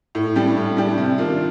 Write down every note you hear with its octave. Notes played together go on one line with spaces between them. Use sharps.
A2
G3 D4 G4
A2
G3 D4 G4
C3
D#3 A#3 D4 F4